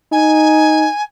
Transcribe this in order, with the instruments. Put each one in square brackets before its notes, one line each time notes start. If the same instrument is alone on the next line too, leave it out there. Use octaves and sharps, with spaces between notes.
[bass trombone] D#4 [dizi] G#5